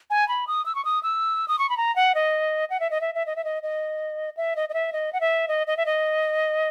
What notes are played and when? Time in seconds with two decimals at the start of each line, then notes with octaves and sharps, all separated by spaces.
0.10 G#5
0.28 B5
0.47 D#6
0.66 E6
0.75 C#6
0.85 D#6
1.03 E6
1.48 D#6
1.59 C#6
1.70 B5
1.77 A#5
1.96 F#5
2.15 D#5
2.70 F#5
2.80 E5
2.91 D#5
3.01 E5
3.15 E5
3.26 D#5
3.36 E5
3.44 D#5
3.63 D#5
4.37 E5
4.56 D#5
4.69 D#5
4.74 E5
4.93 D#5
5.13 F#5
5.21 E5
5.48 D#5
5.67 D#5
5.77 E5
5.86 D#5